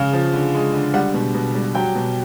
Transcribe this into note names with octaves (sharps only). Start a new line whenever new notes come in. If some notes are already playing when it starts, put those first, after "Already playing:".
Already playing: C#3
F3
D3
G#3
D3
G3 F#5
B2
B2
G3
F#3 G5
B2